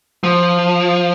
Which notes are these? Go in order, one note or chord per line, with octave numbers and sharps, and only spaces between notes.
F3